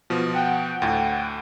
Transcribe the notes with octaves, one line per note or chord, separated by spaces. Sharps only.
B2 F3
F#5 G5
D2 A2